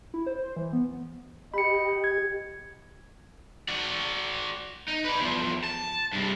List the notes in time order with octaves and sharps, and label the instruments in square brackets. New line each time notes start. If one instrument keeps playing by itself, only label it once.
[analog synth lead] E4
C5
C5
E3
B3
[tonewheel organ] G4 [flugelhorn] D#5 [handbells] B5 C#7
[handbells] G#6
[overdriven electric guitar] F#4 D5
D#4
B4 D5
E2 F3
A5
G2 C3